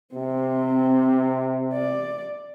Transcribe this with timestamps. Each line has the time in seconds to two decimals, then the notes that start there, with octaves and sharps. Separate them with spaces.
0.15 C3 C4
1.74 D5